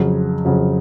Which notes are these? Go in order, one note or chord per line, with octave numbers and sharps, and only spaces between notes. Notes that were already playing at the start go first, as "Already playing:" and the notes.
Already playing: F2 C#3 F#3
F2 C#3 F#3